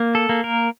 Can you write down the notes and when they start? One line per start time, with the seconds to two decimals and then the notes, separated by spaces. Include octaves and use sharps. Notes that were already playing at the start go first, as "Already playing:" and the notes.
Already playing: A#3
0.15 A4
0.29 A#3
0.44 A#4